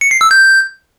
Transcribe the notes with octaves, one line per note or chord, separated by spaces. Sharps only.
C#7
C7
E6
G6